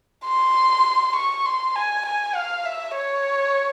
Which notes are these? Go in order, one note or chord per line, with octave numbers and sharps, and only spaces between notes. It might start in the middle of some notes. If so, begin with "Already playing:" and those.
C6
C#6
C6
G#5
G#5
F5
E5
C#5